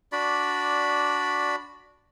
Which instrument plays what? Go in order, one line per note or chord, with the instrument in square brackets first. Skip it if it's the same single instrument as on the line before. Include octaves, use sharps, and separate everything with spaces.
[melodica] D4 F#4 D5 B5